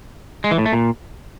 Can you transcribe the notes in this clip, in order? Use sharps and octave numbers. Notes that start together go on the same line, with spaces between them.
G#3
E3
A2
A3
A#2